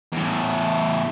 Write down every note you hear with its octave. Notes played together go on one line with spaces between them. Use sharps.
E2 A2